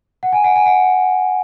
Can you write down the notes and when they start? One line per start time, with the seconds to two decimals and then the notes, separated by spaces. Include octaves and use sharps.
0.23 F#5
0.32 G#5
0.44 F#5
0.56 G#5
0.66 F#5